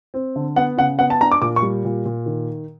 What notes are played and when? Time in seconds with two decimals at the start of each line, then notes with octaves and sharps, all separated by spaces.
0.14 C4
0.36 D3
0.56 B3 F#5
0.78 C#3 F#5
0.99 B3 F#5
1.10 A5
1.21 D4 A#5
1.32 D6
1.42 A#2 D6
1.56 C#6
1.62 G3
1.85 A#2
2.05 A#2
2.26 D#3